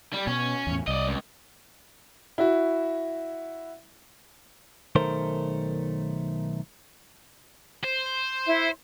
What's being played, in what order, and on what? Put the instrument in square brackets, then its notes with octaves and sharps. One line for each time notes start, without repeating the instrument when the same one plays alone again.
[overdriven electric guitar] G3
[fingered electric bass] B2 [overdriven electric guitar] C#4
[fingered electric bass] E2 A2
[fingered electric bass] C2 [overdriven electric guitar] D5 D#5
[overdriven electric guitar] C#2
[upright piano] E4 F#4
[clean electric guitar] B1 D#3 A3 A#4 C5
[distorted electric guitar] C5
[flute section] E4 E5